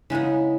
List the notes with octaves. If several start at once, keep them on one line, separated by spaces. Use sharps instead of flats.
C#3 G#3 B3 D#4 E4